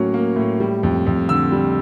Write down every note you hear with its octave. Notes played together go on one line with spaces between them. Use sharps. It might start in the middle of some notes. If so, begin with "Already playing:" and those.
Already playing: A2 F#3 A#3 C#4
A#3
A2
G3
F2
F2
D3 E6
G3